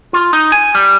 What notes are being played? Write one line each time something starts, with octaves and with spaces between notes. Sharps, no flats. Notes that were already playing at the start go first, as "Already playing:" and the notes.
F4
D#4
G#5
G3